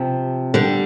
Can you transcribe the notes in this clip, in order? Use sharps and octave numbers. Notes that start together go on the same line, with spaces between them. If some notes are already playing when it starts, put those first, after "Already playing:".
Already playing: C3 F3
D3 G3